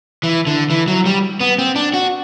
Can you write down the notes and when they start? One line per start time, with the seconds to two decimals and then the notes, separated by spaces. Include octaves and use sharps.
0.23 E3
0.47 D3
0.70 E3
0.88 F#3
1.06 G3
1.41 B3
1.59 C4
1.76 D4
1.94 F#4